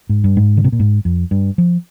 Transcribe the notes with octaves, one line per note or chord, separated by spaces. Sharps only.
G#2
G2
G#2
D3
C3
A#2
G#2
F2
G2
F3